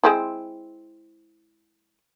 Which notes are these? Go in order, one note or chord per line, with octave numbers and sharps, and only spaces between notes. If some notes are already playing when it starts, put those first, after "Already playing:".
G#3 C4 E4